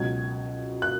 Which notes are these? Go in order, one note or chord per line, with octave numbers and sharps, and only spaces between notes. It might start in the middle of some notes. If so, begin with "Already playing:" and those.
Already playing: C#2 B2 F#3 G#6
F#6